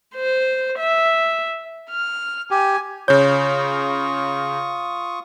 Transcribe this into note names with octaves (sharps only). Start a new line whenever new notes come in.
C5
E5
F6
G4 G#5
C#3 F4 C#5 C#6 D#6 G6